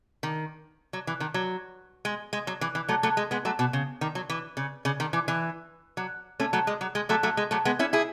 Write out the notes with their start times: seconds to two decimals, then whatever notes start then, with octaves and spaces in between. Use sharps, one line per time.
0.23 D#3
0.93 F#3
1.07 E3
1.20 D#3
1.34 F#3
2.05 G#3
2.33 G#3
2.47 F#3
2.61 E3
2.75 E3
2.89 F#3 A3
3.03 F#3 A3
3.17 G#3
3.31 G#3 B3
3.45 F#3 A3
3.59 B2
3.73 C#3
4.01 D#3
4.15 F#3
4.30 E3
4.57 C#3
4.85 C#3
5.00 D#3
5.13 E3
5.28 E3
5.97 F#3
6.40 A3 C#4
6.53 F#3 A3
6.67 G#3
6.81 F#3
6.95 G#3
7.09 F#3 A3
7.23 F#3 A3
7.37 G#3
7.51 F#3 A3
7.65 G#3 B3
7.79 C#4 E4
7.93 E4 G#4